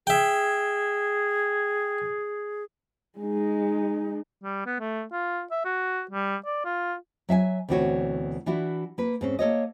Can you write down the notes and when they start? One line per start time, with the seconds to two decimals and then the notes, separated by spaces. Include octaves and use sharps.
0.07 G#4 E5 G5
3.19 G#3 D#4
4.43 G3
4.66 B3
4.79 A3
5.12 F4
5.51 E5
5.65 F#4
6.11 G3
6.45 D5
6.65 F4
7.29 F#3 E5 F5 G#5
7.69 D2 B2 E3 C4 F#4 C#5
8.46 E3 D4 E4 F#4
8.98 A#3 B4
9.21 G#2 C4 C#4
9.39 A#3 A4 C#5 D#5